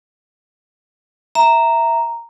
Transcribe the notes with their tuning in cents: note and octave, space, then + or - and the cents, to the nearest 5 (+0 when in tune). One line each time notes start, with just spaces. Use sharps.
E5 +0 A#5 -5